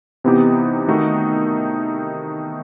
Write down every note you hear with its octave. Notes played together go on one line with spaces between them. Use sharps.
C3 E3 B3 D#4 G4
D#3 A3 D#4 F#4